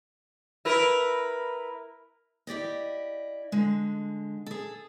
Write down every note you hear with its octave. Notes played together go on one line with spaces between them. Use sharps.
E4 A#4 B4
E4 G4 D5 D#5
D3 G#3
G#4 A4